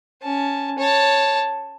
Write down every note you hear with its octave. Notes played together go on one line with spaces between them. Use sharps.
C#4 A5
C#5 A5